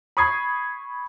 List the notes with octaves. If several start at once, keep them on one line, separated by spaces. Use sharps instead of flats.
B5 C#6 D#6 G#6 C7